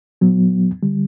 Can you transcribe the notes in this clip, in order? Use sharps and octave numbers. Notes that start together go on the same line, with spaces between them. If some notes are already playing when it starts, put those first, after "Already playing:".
A#2 F#3 B3
D3 G3